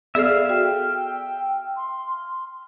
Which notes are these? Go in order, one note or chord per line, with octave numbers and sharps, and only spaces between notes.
B3 G#4 A4 D5 E5 F5
F#4 G5
C6